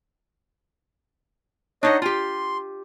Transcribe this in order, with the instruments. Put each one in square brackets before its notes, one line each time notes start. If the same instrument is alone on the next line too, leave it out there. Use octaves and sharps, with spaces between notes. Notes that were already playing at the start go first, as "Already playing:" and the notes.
[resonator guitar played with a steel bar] D4 D#4 F#5 [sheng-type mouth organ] C#5 D#5
[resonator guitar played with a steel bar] F4 G4 [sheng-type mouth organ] C6